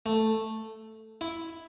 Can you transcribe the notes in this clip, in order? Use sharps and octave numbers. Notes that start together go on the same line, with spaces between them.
A3
E4